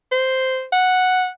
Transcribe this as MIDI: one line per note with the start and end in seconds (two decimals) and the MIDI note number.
0.12 0.63 72
0.72 1.28 78